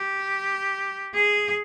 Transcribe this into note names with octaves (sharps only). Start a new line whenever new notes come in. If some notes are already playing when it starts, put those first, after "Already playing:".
Already playing: G4
G#4